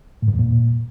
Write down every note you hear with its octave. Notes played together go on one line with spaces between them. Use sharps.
A2
G2
E2
A#2